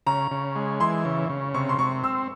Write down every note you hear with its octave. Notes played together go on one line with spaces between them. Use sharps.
C#3 A#5
C#3
G#3
E3 C6
C#3
C#3
C3 C#6
C6
C3 C#6
C4 E6